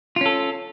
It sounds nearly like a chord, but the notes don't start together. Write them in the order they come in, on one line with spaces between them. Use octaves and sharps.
F4 C#4 A4